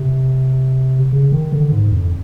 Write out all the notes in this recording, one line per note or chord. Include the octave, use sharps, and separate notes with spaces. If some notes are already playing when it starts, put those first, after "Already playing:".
Already playing: C3
C#3
D#3
D3
G#2
F2